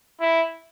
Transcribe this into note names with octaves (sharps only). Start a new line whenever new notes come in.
E4